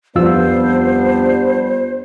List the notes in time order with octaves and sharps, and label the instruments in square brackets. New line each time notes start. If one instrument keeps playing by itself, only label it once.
[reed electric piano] F2 F4 E6 [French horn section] G3 B3 D4 [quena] C5